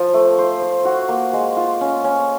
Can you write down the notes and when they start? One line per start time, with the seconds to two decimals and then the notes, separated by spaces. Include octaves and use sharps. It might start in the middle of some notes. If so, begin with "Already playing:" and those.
Already playing: F3
0.14 A3
0.38 C5
0.62 C5
0.85 F#4
1.09 A#3
1.33 G#3
1.57 F4
1.81 C#4
2.04 C#4